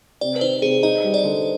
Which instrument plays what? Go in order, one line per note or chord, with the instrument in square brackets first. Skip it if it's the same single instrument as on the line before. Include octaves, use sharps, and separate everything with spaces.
[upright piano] C3 [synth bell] D5
[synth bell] B4
[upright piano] D#3 [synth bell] C5
[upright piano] C3 [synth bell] G#4
[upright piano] D#4 [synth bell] D#5
[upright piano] G3
[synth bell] D5
[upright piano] D3